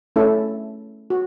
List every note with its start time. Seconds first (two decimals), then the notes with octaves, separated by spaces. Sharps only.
0.16 A3 C#4 E4 A4
1.10 F#4